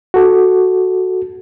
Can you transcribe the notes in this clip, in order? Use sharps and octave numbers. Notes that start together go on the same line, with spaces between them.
F#4 A4